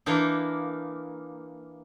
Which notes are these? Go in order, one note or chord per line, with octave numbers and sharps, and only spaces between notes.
E3 A#3 D4 D#4